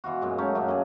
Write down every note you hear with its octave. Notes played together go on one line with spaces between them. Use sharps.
B2 E3 F4 F#4
F#2 A#2 G#3
A3 C#4 D#4
F#2 A#2 F#3 D4
A#2 A3 G#4